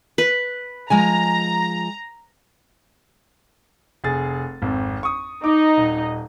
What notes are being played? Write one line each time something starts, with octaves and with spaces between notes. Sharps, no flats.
B4
F3 G#3 G#5 A#5
F1 G#4 A6
G#1 F2
C#6 D#6
D#4 D#5 D6
D#1